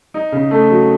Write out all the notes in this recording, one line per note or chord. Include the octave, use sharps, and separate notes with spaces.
D#4
C#3
A3
F#3